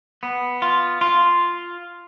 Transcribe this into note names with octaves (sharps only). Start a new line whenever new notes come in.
B3
F4
F4